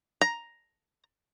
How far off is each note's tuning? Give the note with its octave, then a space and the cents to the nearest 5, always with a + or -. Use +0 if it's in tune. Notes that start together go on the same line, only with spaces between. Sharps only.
A#5 +5